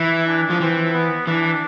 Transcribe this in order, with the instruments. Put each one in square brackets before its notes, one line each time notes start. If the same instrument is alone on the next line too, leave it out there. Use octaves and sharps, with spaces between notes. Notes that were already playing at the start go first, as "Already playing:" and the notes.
Already playing: [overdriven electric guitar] E3 [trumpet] E4
[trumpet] D4
[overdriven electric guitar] F3
[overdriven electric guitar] E3 [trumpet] C4
[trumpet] B3
[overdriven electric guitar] E3 [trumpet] D4